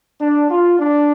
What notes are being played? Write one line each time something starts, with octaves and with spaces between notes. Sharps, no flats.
D4
F4
D4